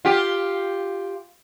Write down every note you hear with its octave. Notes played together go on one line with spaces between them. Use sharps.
F4 G4